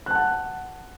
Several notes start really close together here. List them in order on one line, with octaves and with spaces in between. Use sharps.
F#6 A5 F#5